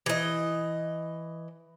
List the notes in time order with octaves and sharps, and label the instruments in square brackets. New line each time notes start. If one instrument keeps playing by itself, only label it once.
[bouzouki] E3 D#5